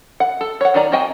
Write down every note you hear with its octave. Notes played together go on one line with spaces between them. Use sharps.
F#5
A4
C#5 F#5
D#3 D#4 D5 A#5
C4 F#4 D#5 G5 G#5